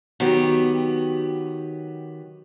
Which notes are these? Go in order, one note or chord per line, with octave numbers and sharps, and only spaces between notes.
D#3 F#3 B3 G4